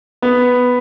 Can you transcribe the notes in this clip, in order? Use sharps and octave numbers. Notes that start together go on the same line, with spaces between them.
B3